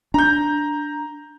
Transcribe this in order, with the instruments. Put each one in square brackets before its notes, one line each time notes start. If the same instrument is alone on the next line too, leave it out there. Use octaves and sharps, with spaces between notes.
[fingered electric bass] D4 [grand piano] A#5 G6